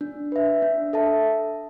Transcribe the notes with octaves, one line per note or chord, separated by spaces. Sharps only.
D4
B4 E5
D4
A4 E5 A5